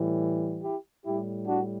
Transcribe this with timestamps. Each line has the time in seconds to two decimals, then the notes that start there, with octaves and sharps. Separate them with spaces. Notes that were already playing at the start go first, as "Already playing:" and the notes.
Already playing: A2 E3 G3
0.63 E4 G4
1.05 A2 G3 E4 G4
1.47 D4 F#4